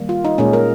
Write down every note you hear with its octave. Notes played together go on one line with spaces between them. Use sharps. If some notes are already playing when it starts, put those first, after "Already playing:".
Already playing: D#3 G3 A#3
F4
D#4
A#2 G#3 C#4
A#4